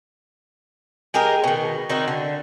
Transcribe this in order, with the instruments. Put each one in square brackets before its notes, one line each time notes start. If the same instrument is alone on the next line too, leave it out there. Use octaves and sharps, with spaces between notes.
[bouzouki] G#3 G4 G#4 A#4
B2 D#3
D#3 C4 D#4 F#4
D3